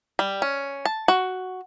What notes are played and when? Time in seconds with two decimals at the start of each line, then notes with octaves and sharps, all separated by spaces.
0.19 G3
0.42 C#4
0.85 A5
1.08 F#4